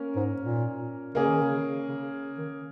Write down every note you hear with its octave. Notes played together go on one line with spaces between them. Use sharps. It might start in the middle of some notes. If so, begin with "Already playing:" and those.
Already playing: A#3 C#4 A#4
G#2
A#2
C#3 A#3 C#4 G#4
D#3
C#3
C#3
D#3